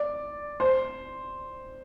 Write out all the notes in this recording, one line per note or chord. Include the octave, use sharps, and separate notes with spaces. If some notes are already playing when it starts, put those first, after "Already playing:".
Already playing: D5
C5